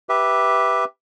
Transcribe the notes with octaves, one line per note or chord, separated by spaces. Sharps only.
G4 B4 E5